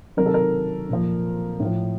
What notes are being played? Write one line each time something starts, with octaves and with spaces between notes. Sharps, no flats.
C3 D#3 F#3 A#4
A4
A#4
A#2 F3
A2 F3